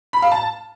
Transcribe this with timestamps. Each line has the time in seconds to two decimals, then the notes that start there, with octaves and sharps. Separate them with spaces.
0.13 B5
0.22 F5
0.32 A5